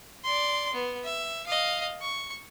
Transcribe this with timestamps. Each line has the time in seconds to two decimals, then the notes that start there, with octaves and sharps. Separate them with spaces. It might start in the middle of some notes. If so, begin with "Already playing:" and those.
0.24 D5 C6
0.73 B3
1.04 E5
1.46 D#5 F5
2.01 C#6